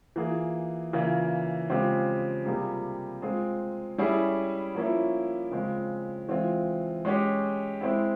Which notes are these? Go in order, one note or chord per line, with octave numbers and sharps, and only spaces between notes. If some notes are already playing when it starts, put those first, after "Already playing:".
E3 A#3 F4 G#4
C#3 E3 A#3 F4
C#3 F3 G#3 C4 G4
C3 G3 A#3 F4 G#4
G#3 C4 F4 G#4
G3 C#4 E4 G#4
F3 A#3 C#4 E4
C#3 F3 G#3 C4
E3 G#3 C4 F4
G#3 C#4 G4
G#3 C4 E4